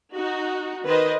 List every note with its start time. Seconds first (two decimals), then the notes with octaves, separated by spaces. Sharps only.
0.15 D#4 F#4
0.84 D#3 B4 C5 D#5